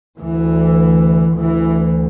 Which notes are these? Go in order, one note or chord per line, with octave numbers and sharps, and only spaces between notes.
D2 E3
D2 E3